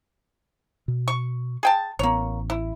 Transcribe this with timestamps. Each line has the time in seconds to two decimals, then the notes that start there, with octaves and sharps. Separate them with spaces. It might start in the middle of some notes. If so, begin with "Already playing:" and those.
0.88 B2
1.08 C#6
1.63 G#4 G5 A5
1.99 A1 A#3 B3 C#5
2.50 E4